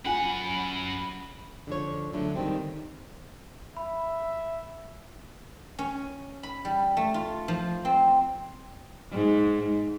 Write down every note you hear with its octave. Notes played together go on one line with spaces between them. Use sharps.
F#2 C#4 F4 F#5 G#5 B5
D3 F3 C#5
D3 F#3 A3
D#3 G3 C4
E5 B5
C#4
B5
G3
A3
F4
F3
C4
G#2